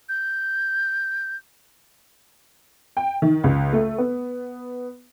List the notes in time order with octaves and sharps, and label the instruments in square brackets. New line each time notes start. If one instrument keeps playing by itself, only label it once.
[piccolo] G6
[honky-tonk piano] G5
D#3
C#2
A3
B3